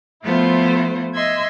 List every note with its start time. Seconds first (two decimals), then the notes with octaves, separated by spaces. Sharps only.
0.23 F3 A3 B3 E4 F4 C5
1.14 D#5 E5 C6 E6 G#6